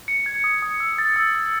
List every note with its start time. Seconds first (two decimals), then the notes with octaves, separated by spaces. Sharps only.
0.08 C#7
0.26 G#6
0.44 D#6
0.62 D#6
0.80 E6
0.98 A6
1.16 E6
1.35 A6